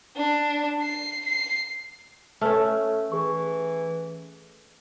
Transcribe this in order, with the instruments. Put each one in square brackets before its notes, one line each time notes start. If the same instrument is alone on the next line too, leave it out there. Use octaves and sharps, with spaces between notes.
[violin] D4
C7
C7
[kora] A3 C#4 [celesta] A4 B4 F6
[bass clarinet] E3 [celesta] G#4 C#6